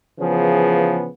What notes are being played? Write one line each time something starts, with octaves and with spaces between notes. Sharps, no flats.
C#3 E3 F3 B3 G#4